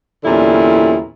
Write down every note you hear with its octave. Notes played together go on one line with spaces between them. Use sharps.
E2 A#2 D3 G3 C#4 E4